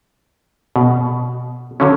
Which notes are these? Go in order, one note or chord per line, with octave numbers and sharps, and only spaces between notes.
B2
D3 F#3 C#4